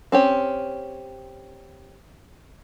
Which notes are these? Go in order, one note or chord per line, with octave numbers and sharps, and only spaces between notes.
C4 C#4 G4